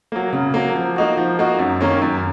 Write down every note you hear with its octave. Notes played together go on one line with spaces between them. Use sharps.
F#3 A#3
C#3
F#3 A#3
F3
A#3 D#4 F#4
F3
A#3 D#4 F#4
F#2
D#3 A#3 C#4
F#2